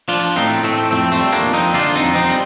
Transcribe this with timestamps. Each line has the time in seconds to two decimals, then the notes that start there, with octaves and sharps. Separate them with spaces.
0.08 F3 D4 F4
0.36 A2 C4 D#4
0.63 A2 A3 C4
0.91 F2 A3 C4
1.12 A3 C4
1.20 G3
1.32 A#3 D4
1.47 F2
1.53 C4 D#4
1.74 D3 D4 F4
1.95 C4 D#4
2.02 F2
2.15 C4 D#4
2.30 G3